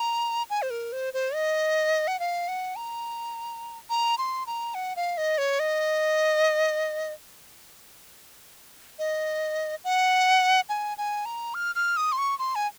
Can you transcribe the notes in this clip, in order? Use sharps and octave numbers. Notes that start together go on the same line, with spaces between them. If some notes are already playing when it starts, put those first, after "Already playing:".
Already playing: A#5
G#5
C5
A#4
C5
C5
D#5
F#5
F5
F#5
A#5
A#5
C6
A#5
F#5
F5
D#5
C#5
D#5
D#5
F#5
G#5
G#5
A#5
F6
F6
D#6
C6
C#6
C6
G#5